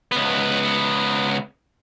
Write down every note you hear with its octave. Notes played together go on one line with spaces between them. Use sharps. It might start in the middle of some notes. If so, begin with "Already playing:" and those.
C#2 B3